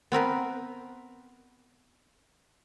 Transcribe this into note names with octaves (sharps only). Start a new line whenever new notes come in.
B3 C4 A#4 B4